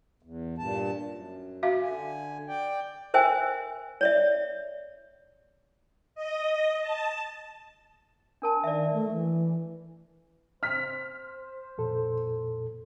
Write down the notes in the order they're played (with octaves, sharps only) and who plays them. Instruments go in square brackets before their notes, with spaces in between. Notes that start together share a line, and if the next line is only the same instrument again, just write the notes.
[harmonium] E2
G2 A#2 A5
F#2
[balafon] F#4 E5 F5
[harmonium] D3 G#5
D5 G5
[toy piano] A#4 C5 E5 G5 G#5
C#5 D5 E5
[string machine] D#5
A5
[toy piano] D4 A#4 A5
[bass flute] D#3 [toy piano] D5 E5
[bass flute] A3
E3
[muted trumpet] C5 [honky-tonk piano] F6 B6
[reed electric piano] F2 A#2 A4